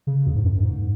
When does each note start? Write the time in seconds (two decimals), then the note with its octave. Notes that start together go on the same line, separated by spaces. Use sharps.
0.07 C#3
0.26 E2
0.36 G#2
0.45 F#2
0.55 F#2
0.63 G#2